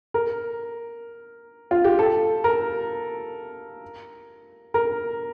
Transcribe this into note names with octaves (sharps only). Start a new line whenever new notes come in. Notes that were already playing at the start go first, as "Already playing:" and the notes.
A#4
F4
G4
A4
A#4
A#4